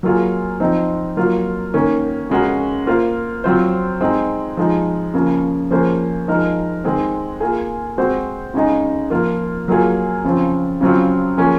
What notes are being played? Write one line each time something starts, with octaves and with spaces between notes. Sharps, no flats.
F#3 A#3 F4 G#4
F3 C4 D#4
F#3 A#3 F4
D#3 A#3 C#4
C#3 G#3 C#4 F#4 A#4
A#3 F4 C5
F#3 C4 F4 C5
G#3 C4 D#4
F3 G#3 D#4
C#3 F3 A#3
F3 A#3 C#4 G#4 C5
F3 G#3 D#4 A#4
D#3 G#3 C4
A#3 F4 G#4
G#3 C4 F#4 C5
C#3 G#3 D#4
F3 A#3 F4
F#3 A#3 F4 G#4
C#3 F3 C4
C#3 F#3 C4 F4
F3 A#3 C#4 G#4